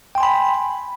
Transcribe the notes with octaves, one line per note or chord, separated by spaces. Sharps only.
G5 G#5 B5 C6